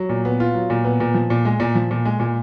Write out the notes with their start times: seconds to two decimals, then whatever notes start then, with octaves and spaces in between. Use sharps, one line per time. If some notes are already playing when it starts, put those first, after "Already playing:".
Already playing: F#3
0.09 A#2
0.25 B3
0.40 F4
0.54 F#3
0.70 A#2
0.84 B3
1.00 A#2
1.14 F3
1.30 A#2
1.45 G#3
1.60 A#2
1.75 F3
1.91 A#2
2.05 G#3
2.20 A#2